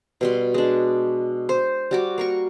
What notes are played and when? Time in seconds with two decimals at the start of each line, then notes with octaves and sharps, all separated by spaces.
0.21 B2 G3 C6
0.54 G#3 D4
1.49 C5
1.91 G3 F#4 D6
2.18 A#3 A#4 C#6